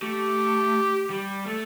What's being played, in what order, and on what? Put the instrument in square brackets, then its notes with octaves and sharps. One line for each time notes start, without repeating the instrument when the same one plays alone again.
[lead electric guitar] A3 [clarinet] G4
[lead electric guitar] G3
[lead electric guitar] A3 [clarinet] A4